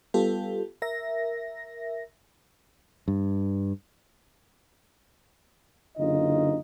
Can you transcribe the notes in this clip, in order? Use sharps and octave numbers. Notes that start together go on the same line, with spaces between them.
G3 B3 F4 G4 A4
A#4 E5 A#6
G2
F#1 D3 D#4 F4 D#5